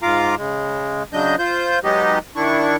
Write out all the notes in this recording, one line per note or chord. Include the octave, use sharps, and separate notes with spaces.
G#2 F4 F5 A#5 D6
C#3 G#3
C#3 F#3 D4 D#5 G6
F4 C5 G6
F#3 G#3 B3 D#4 G4 D#5
D#3 D4 E4 C#6